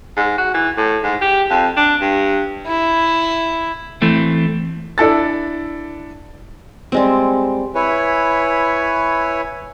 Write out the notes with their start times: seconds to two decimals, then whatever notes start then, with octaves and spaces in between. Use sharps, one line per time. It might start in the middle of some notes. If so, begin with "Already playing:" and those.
0.17 G#2
0.38 F#4
0.54 E3
0.77 A2
1.04 G#2
1.21 G4
1.50 F2
1.77 D4
2.01 G2
2.66 E4
4.02 E3 A3 C4
4.98 D4 E4 A4 A6
6.92 G3 G#3 C4
7.75 E4 B4 C#5 G#5